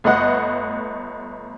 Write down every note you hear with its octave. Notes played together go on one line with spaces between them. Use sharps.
G1 A3 B4 D#5 F#5